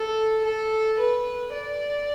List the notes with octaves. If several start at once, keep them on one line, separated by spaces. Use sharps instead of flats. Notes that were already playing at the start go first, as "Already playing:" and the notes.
Already playing: A4
A4
B4
D5